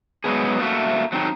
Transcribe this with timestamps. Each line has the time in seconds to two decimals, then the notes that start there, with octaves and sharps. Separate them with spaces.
0.24 F#3 G#3 B3 G#4
0.60 A3 A#3 F#4 E5
1.12 F#3 C4 D#4